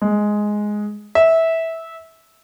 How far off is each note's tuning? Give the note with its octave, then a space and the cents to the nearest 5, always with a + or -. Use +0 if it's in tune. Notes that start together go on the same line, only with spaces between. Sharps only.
G#3 +5
E5 -15